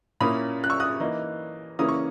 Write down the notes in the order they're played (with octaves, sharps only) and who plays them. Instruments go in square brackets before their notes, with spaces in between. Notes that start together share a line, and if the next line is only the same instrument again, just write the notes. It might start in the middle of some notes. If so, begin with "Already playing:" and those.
[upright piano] A#2 A#3 C#4 E4 B5 D#6
F#6
C#6 E6
D#6 F#6
E3 A#3 D#4
C#3 E3 A#3 C#4 E4 D#6
C#6